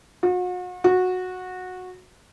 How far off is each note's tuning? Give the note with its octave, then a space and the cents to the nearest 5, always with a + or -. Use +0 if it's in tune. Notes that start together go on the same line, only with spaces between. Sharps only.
F#4 -40
F#4 -15